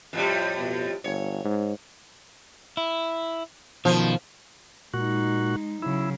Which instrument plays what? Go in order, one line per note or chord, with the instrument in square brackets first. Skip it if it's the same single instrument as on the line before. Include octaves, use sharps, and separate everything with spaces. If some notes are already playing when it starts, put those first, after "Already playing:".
[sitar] F2 A2 G3
[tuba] B2
[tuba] G1 [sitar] C#5
[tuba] G#2
[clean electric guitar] E4
[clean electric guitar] B2 D#3 [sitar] F3
[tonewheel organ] A#2 F#4 [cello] G#3 D#4
[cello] C#3 F#3 [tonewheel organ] E4